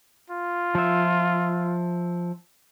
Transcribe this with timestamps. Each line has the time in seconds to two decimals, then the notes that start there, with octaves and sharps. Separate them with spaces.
0.30 F4
0.75 F3 E5